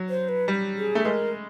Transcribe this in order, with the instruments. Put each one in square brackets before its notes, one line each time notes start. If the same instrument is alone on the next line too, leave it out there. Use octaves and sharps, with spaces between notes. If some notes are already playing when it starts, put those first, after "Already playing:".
Already playing: [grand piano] F#3
[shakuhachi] C5
B4
[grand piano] G3
[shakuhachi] G#4
[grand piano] A3
[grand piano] G#3 [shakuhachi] B4
[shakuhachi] A#4